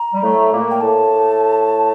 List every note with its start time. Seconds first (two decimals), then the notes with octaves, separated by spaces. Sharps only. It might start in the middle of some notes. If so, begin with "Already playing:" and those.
Already playing: A#5
0.14 G3
0.22 A2 A3
0.51 A#2 A#3
0.70 G5
0.81 A2 A3 A5